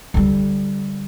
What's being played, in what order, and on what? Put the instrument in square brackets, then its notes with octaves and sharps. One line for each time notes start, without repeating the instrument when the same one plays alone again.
[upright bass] D3 G3